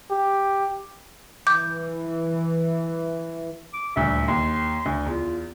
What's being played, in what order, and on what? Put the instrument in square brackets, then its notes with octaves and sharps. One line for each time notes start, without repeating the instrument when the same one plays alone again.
[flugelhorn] G4
[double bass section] E3 [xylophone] D6 G6
[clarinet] D6
[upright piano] D#1 D2 [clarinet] E5
[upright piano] D#2 [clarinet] C6
[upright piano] D2
[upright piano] E2 [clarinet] F4